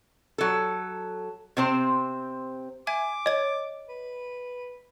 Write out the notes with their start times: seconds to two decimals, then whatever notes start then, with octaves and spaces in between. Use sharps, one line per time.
0.38 F#3 A4
1.57 C3 C4 C5
2.87 E5 G#5 D6 G#6
3.26 C#5 D#5 G#6
3.89 B4